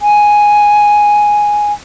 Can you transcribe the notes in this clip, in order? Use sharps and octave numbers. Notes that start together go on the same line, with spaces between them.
G#5